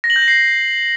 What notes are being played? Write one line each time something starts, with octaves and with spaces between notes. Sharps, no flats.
A#6
F#7
G6
A#6
C7